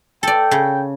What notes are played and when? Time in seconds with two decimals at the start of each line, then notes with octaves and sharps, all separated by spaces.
0.23 A4 D5 G5
0.51 C#3